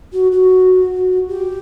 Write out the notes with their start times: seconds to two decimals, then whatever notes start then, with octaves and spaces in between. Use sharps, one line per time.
0.13 F#4
0.32 F#4
1.28 G4